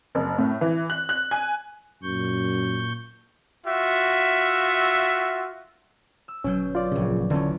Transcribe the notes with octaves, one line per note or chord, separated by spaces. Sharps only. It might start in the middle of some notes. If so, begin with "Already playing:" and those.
F#1
A2
E3
F#6
F#6
G#5
F#2 A#2 C#6 G6
F4 F#4 E5
E6
G1 B2 F#3 C#4 G6
F4 D5
A#1 C#3
E2 D3 C#4